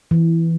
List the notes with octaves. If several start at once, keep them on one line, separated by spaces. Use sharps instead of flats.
E3